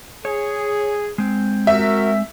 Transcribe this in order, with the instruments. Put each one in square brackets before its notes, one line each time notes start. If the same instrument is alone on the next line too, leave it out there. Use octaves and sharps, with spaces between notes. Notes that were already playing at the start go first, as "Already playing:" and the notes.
[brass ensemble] G#4 [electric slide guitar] C#5
[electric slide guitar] G#3 C4
[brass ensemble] F#4 A#4 [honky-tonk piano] E5